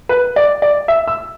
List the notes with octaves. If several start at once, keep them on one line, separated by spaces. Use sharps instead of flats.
B4
D5
D5
E5
E6